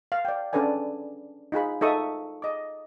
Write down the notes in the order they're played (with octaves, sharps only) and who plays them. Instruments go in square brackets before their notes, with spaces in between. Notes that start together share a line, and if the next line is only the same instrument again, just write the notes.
[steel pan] F5
D5 G5
C#4 D4 A4 B4 D5 G#5
D#4 F4 G#4 B5
D#4 F4 A4 E5 C#6 D#6
D#5 D6